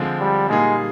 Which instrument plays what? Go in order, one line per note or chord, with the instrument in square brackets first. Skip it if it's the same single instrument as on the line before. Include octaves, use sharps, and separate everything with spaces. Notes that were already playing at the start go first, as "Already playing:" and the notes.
Already playing: [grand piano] D3 F3 G#3 C4 F4
[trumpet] G3
[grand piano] A#2 G3 A#3 D#4 G#4 [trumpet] G#3